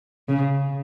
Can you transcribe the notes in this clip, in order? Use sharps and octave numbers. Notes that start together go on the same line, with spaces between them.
C#3